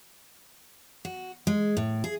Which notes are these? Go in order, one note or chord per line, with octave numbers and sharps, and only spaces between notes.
F#4
G#3
A2
G#4